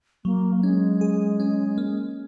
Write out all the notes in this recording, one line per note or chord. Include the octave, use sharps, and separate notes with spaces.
F#3 A#3
A#3
G#3 C#4
G#4
C#4
A#3